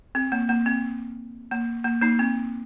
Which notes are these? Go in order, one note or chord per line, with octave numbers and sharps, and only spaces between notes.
C4
A#3
A#3
C4
A#3
A#3
A#3 D#4
C4